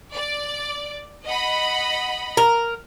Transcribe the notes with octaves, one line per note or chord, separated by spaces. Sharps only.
D5
D#5 F#5 B5
A#4